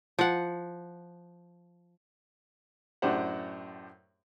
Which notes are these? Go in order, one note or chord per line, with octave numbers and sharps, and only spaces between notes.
F3 F#5
F#2 A2 D4 G4 C5 F#5